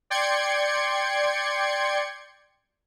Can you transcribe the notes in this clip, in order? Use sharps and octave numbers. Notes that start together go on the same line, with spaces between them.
D5 G5 C6 G#6 C#7